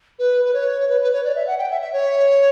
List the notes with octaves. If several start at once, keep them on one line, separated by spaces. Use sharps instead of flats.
B4
B4
C#5
B4
B4
C#5
D5
E5
F#5
G5
E5
E5
C#5